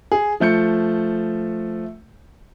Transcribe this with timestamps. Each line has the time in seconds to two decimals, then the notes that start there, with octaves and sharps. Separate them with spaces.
0.12 G#4
0.40 F3 A3 G6 C#7